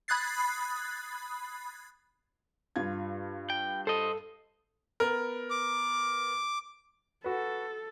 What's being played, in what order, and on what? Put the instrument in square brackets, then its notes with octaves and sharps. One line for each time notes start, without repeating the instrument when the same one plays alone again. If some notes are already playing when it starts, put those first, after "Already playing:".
[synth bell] B5 D#6 F#6 G#6 A6 C7
[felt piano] G2 F4 G#6
[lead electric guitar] G5
[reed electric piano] A4 [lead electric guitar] C5 D#5
[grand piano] B3 A#4
[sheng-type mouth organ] D6
[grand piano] F#4 B4 [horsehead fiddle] A4